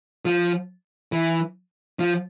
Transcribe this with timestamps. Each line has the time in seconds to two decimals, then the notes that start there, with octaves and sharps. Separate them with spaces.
0.25 F3
1.12 E3
1.99 F3